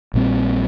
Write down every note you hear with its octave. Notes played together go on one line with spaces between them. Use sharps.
A#1 A#2 G3 C4